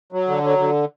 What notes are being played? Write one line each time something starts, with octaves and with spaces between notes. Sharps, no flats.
F#3
D3
F#3
D3